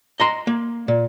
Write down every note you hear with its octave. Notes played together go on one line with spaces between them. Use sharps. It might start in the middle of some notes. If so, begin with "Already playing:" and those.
D#5 A#5 C6
A#3
A#2